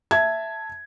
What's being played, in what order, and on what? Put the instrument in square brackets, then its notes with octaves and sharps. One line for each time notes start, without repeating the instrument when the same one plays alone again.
[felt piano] E5 A5 G#6